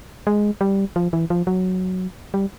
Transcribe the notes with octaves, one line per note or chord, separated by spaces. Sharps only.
G#3
G3
F3
E3
F3
F#3
G3